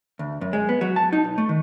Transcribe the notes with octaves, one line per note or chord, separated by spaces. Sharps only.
D2
F#2
G#3
B3
F#3
A5
D#4
B1
A3
D#3